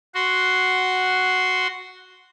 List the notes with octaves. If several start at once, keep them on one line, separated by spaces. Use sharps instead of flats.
F#4 C6